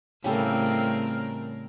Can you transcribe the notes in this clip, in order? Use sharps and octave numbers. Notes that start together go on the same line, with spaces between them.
A2 C#3 G3 C4 A4 A#4